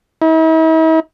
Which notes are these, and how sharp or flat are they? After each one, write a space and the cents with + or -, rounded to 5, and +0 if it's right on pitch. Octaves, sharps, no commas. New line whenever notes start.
E4 -45